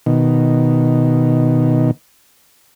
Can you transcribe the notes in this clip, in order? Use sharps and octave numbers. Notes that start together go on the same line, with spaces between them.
B2 D#3